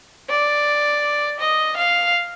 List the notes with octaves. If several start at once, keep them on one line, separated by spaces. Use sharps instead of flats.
D5
D#5
F5